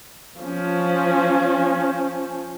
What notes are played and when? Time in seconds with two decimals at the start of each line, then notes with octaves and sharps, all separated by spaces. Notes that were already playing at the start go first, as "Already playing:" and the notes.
0.40 F3 C#4